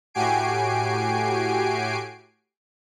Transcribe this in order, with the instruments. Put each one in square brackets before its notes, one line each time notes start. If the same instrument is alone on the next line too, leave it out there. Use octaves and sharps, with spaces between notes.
[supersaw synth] A2 F#4 G4 G#5 C7 D7